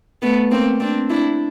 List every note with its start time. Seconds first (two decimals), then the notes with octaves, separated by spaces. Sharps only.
0.22 A3 B3
0.51 A#3 C4
0.80 C4 D4
1.10 D4 E4